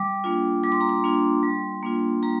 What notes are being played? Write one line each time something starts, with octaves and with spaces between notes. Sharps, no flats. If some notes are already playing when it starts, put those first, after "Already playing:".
Already playing: G3 D6
A#3 D4 F4
G3 D6
C6
A#5
C6
A#3 D4 F4
G3
A#3 D4 F4
G3 A#5